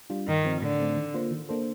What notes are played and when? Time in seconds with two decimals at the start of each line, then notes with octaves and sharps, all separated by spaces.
0.10 G3 D4 F4
0.27 G2 D#3
0.44 F3 C4
0.61 A2 D3
0.80 A3 C4
0.96 D#3
1.14 A#3 F4 C5
1.31 D#3
1.49 A#3 D4 A4 C5